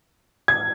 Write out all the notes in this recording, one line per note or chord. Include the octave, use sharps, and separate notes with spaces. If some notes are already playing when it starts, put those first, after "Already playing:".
G#6